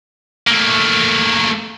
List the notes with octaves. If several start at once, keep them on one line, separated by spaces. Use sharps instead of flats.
A3 A#3